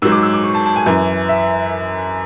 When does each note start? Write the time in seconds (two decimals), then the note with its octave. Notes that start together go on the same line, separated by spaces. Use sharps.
0.02 G#2 E6
0.05 F#3
0.12 D6
0.23 E6
0.34 D6
0.44 C#6
0.55 A5
0.66 A5
0.76 G#5
0.86 F#2 E3
1.29 E5